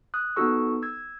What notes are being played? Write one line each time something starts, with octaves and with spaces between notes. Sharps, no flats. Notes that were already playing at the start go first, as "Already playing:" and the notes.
D#6 F#6
B3 D#4 F#4 A4 C#6 E6
E6 G#6